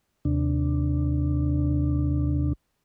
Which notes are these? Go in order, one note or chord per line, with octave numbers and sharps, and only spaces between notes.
D#2 C3 D4